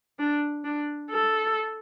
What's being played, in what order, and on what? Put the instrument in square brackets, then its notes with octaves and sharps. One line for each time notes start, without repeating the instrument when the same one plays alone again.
[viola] D4
D4
A4